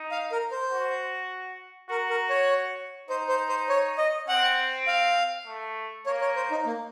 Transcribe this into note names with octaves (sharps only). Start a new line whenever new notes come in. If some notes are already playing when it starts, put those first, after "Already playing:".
Already playing: D#4
F5
A#4
C5
F#4
F#4 A#4
A#4
C#5
D#4 C5
C5
C5
C#5
D#5
C4 F#5
F5
A3
A#3 C#5
C#5
C5
D#4
A#3